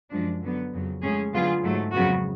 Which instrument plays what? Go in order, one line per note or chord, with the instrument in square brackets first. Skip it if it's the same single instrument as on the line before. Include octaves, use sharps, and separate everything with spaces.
[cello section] F#2 F3 G#3 D4
D3 F#3 B3
F2 C#3 F#3
A2 G#3 C#4 G#4
D3 F#3 B3 F4 G#4
G#2 F#3 A3
F2 C#3 F#3 B3 F#4